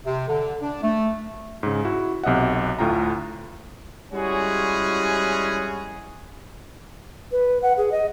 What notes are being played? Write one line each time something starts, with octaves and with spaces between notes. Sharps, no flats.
C3
D3
D4
A3
G#2 C#3
E4 F#4
B1 C3 D#5 E5 F#5
D2 A2 F4 G5 A#5
G3 G#3 C#4 E4 F#4 G#4
B4
F#5
G#4
D#5